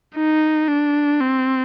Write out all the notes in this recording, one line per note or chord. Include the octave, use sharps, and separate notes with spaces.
D#4
D4
C4